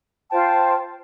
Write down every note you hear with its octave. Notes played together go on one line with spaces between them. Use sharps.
F4 C5 G5 A5